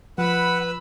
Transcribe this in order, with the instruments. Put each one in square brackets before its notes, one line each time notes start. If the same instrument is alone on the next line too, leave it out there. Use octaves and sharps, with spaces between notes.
[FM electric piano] F3 [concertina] B4 [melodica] F#5 [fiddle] B5 E6